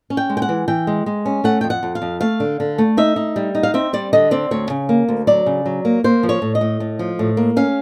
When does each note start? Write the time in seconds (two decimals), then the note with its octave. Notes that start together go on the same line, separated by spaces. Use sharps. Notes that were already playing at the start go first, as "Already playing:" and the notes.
0.10 C#4
0.17 G5
0.30 G#3
0.37 G5
0.42 F#5
0.49 E3
0.68 E3 G5
0.87 G#3
1.06 G#3
1.26 C#4
1.44 A3 F#5
1.61 F2 G5
1.70 F#5
1.83 F2
1.95 F5
2.02 F2
2.21 A3 F5
2.40 D3
2.60 D3
2.78 A3
2.97 D#4 E5
3.16 D#4
3.36 G3
3.55 D#4
3.63 F5
3.74 C4 E5
3.93 G3 D5
4.13 D3 D#5
4.31 C4 D5
4.51 D2 C#5
4.70 C#3
4.89 A#3
5.09 D2
5.27 F#3 D5
5.46 C#3
5.66 F#3
5.85 A#3
6.04 A#3 C5
6.23 F3
6.29 C#5
6.42 A2
6.55 D#5
6.61 A2
6.80 A2
6.99 F3
7.19 A2
7.37 A#3
7.56 C#4 F5